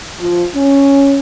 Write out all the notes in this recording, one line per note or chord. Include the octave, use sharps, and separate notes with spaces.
F3
C#4